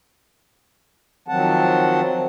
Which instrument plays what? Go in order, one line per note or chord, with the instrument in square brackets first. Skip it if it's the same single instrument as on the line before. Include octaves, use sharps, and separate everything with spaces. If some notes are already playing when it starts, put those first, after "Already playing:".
[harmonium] D#3 F3 F#3 C4 F#5 A5